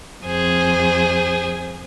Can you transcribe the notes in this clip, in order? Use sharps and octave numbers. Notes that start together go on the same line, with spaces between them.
F2 G#4 C5